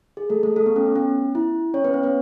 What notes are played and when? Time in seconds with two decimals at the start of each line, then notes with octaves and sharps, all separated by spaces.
0.17 G#4
0.30 A3 A4
0.43 A3 A4
0.56 A3 A4
0.66 B3
0.76 C#4
0.86 B3
0.96 C#4
1.35 E4
1.74 C#4 C#5
1.84 B3 B4
1.94 C#4 C#5
2.03 B3 B4